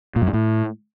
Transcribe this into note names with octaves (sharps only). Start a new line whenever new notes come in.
A#2
F#2
G#2
A2